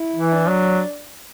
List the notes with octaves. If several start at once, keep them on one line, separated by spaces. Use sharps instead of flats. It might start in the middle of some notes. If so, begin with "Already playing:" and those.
Already playing: E4
E3
D4
F#3